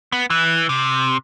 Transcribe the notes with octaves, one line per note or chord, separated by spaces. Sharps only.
B3
E3
C3